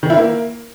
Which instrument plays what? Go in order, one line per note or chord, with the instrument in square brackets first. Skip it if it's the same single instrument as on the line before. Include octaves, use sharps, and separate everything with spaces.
[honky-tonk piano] D#3
E4
A#3